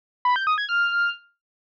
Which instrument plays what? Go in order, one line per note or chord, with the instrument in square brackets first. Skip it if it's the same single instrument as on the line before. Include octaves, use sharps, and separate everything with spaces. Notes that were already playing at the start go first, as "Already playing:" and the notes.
[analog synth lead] B5
G6
D#6
G#6
F6